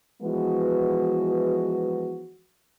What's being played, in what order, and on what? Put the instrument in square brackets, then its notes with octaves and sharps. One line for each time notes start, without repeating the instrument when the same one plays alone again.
[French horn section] E3 F3 G#3 B3 F#4